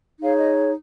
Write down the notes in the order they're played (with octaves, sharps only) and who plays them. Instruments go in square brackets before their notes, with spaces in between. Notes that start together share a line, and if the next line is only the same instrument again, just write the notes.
[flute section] D#4 G#4 C#5 F5
D#5